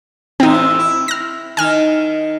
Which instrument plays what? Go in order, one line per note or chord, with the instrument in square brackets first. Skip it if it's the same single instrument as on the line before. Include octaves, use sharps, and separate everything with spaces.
[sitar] A2 C3 E3 [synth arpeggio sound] C4 D#4
[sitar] E4
[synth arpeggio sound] F6 A#6
[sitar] D#3 D#4 [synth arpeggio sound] G#5 F6